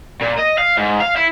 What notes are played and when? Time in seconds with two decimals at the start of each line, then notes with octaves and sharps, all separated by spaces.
0.21 A#2
0.38 D#5
0.58 F5
0.77 G#2
1.00 F5
1.17 E4